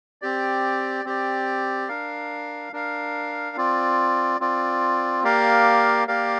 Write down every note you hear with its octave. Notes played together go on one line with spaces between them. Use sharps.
C4 G4 D5
C4 G4 D5
D4 A#4 F5
D4 A#4 F5
C4 F4 D5
C4 F4 D5
A#3 G4 A#4 D5 F5
A#3 G4 A#4 D5 F5